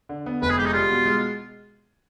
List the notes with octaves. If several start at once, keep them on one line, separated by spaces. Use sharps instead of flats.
D3
B3
F1 B4
G#4
G#3 G4
D#4
G3 F4
B2
G#3